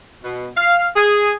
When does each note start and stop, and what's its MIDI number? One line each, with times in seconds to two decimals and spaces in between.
0.24 0.48 47
0.57 0.85 77
0.96 1.33 68